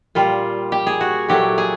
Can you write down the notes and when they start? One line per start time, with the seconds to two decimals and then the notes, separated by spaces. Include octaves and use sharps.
0.15 A#2 G3 F4
0.72 G4
0.87 G#4
1.01 F#4
1.29 A#2 F#3 A3 G4
1.58 G#4